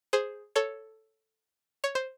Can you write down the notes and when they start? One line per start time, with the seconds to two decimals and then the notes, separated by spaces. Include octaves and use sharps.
0.13 G#4 C5
0.56 A4 C#5
1.84 C#5
1.95 C5